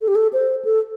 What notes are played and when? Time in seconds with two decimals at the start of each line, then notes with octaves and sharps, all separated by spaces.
0.01 A4
0.08 G4
0.15 A4
0.33 C5
0.65 A4